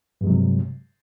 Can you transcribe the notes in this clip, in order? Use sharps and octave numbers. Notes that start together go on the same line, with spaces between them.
G2 C3 F#3 G#3